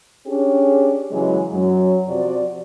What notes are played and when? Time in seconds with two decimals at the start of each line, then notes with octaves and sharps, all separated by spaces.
0.26 C#4 D4 G4 G#4
1.11 C#3 E3 F#3 G#3
1.52 F#2 F#3
2.06 C3 F3 F#4 D5